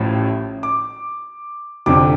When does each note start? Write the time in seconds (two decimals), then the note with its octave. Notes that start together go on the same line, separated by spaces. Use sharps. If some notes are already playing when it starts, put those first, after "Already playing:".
Already playing: A1 A2 F3
0.63 D6
1.86 F1 F2 D3 D6